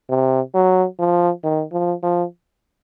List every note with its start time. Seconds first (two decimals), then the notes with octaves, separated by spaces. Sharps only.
0.10 C3
0.54 F#3
0.99 F3
1.43 D#3
1.72 F3
2.03 F3